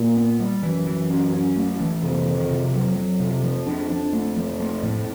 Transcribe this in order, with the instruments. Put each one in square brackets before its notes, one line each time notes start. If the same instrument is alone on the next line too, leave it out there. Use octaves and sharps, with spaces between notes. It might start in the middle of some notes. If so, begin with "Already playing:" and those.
Already playing: [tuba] A#2
[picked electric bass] B3
G3
[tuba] F#2 [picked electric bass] E3
[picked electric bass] E3
C#4
C#4
A3
E3
[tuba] F2 [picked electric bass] C3
[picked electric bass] D#3
C3
[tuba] F2 [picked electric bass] F#3
[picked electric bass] F#3
C3
F3
D4
D4
A3
F3
A3
A2